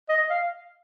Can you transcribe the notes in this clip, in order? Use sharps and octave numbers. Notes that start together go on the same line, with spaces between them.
D#5
F5